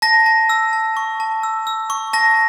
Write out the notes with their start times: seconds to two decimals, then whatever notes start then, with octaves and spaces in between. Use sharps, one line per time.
0.02 A5 A#6
0.26 A5
0.49 E6
0.73 A5
0.97 C#6
1.20 A5
1.43 E6
1.67 E6
1.90 C#6
2.13 A5 A#6